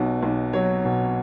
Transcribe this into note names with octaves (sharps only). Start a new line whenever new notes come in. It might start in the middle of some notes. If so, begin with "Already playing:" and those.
Already playing: B1 B2
B1
F#3 C#5
B2